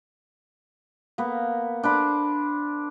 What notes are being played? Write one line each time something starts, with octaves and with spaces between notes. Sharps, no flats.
A#3 B3
D4 C5 B5